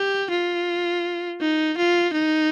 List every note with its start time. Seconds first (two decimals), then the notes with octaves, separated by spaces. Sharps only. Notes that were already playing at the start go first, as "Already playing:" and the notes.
Already playing: G4
0.30 F4
1.40 D#4
1.77 F4
2.13 D#4